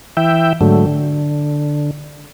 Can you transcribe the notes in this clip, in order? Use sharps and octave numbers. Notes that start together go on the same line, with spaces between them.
E3 E5 G5
G#2 D3 F#3 A3
D3